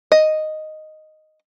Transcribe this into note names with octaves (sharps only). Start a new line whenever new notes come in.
D#5